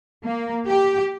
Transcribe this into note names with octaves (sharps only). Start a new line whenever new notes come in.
A#3
G4